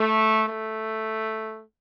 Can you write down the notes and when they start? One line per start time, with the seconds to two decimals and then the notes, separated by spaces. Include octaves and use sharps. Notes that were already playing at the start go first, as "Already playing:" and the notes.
Already playing: A3
0.48 A3